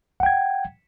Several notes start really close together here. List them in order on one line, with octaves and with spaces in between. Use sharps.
F#5 G5 G#6